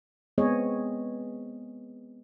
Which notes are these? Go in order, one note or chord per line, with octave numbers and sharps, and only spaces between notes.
G#3 B3 C4 G#4 C#5 D#5